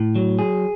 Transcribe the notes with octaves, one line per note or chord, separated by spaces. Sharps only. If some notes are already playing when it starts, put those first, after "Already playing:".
Already playing: A2
F#3
G#4